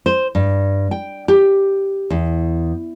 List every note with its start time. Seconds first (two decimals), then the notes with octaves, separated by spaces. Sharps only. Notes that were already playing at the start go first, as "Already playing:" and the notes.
0.06 C5
0.35 G2
0.91 G5
1.28 G4
2.10 E2